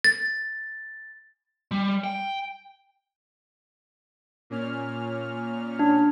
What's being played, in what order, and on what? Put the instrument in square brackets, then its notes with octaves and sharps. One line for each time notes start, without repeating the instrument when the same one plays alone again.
[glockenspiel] A6
[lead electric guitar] G3
G5
[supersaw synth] A#2 C#4 F6
[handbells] D4